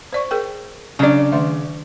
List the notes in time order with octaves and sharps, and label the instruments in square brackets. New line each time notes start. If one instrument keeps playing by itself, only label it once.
[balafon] C5 D5 C#6
G#4 A#4 G5
[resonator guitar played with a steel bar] C#3 D5 [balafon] F#3 D4
[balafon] D#3 A3 E5